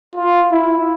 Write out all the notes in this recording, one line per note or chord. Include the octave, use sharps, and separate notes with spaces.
F4
E4